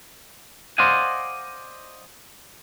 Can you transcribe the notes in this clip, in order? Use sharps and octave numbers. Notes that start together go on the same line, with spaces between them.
C5 D5 D#5 F5 F#5 G#5